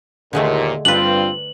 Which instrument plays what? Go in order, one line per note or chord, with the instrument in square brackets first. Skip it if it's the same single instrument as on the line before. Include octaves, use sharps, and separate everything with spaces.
[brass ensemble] D#2 A#2 [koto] D3 G#3 A3
[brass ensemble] G2 C4 F4 [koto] D4 B4 [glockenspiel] F#7